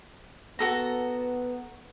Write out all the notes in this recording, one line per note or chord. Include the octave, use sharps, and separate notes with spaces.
B3 F#4 A4 A#5